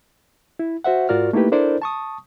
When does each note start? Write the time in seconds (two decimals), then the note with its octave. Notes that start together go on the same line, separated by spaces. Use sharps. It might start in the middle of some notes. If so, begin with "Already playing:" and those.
0.59 E4
0.84 F#4 C5 E5 F#5
1.09 G#2 F4 F#4 A#4 D5 F6
1.33 A3 A#3 D#4 E4 G4 B4
1.52 D4 E4 A4 A#4 C5 D5
1.82 A5 C#6 D#6